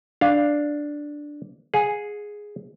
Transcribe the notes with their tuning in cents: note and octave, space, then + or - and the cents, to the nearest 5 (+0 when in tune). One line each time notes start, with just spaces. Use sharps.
D4 +0 F5 +0
G#4 +0 F#5 -45